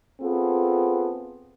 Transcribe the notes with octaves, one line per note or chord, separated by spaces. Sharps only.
B3 C4 F4 G#4 A4